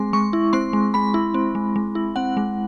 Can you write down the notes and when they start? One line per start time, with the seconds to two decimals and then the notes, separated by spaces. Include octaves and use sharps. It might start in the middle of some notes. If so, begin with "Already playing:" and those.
Already playing: G#3 C4 C6
0.13 G#3 C#6
0.33 E4
0.53 C4 C6
0.73 G#3
0.94 G#3 B5
1.14 E4
1.34 C4
1.55 G#3
1.76 G#3
1.95 E4
2.16 C4 F#5
2.37 G#3